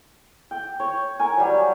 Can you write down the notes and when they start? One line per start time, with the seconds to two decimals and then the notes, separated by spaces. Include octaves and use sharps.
0.51 G5
0.80 C#5
1.19 A#4 G#5
1.37 F#3 G3